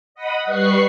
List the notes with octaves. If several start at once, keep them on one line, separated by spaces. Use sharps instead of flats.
D#5 F#5 B5 D#6
G3 B4 C#6 F#6 C7